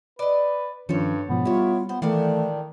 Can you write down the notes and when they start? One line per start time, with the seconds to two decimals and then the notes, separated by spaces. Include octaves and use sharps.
0.19 B4 D5 D#5
0.89 G2 D#3 F3 C#4 A4 C5 C#5
1.29 G#2 B2 F3 B3
1.45 G3 E4 F4 C#5
1.89 B3 C5
2.02 A2 D#3 E3 A3 D4 F5